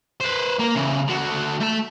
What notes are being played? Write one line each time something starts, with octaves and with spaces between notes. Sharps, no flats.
B4 C5
A#3 A#4
C#3 E3
D3 F#4
A3 A5